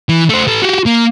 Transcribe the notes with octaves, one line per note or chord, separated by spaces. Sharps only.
E3
A3 C5
A4 B4
F#4 G4
A#3